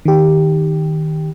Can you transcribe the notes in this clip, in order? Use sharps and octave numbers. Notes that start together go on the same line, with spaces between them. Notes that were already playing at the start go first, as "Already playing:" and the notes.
D#3 G4